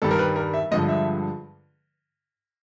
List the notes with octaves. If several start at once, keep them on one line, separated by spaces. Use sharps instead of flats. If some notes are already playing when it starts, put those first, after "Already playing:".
G2 D#3 G3 A4
A#4
B4
A#4
E5
G2 D3 F3 G#3 D#5
E5